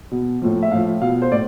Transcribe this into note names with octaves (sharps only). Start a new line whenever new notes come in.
B2
A2 F3
E5
A2 F3 F5
B2 F5
C5
A2 D5